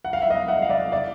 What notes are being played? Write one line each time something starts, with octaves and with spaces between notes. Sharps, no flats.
F#5
F5
E5
D#5 F5
E5 F#5
F5
D5 E5
D5 E5